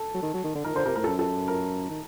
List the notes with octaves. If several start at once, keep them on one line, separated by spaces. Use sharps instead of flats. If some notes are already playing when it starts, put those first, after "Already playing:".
Already playing: A4
F#3
D#3
F#3
D#3
D3
D#3 A#4
D3 C5
C3 A#4
A2 A#4
A4
F#2
A4
A#4
D#3